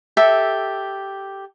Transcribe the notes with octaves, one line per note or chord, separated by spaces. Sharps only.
G4 A4 E5